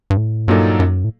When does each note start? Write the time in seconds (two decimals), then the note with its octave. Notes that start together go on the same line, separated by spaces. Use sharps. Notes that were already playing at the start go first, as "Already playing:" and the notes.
0.10 G2
0.17 A2
0.48 G2 A#2 F#3 A#3 D#4 A4
0.80 F#2
1.04 A2